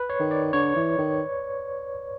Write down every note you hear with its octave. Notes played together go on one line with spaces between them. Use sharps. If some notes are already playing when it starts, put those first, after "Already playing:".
Already playing: B4
C#5
D#3
D5
D3 C#5
E3
D#3